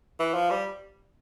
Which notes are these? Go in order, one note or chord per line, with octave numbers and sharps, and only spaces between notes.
E3
F3
G3